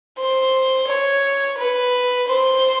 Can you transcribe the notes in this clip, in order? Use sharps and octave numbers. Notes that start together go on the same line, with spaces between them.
C5
C#5
B4
C5